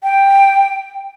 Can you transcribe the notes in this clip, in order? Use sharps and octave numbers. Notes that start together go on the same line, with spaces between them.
G5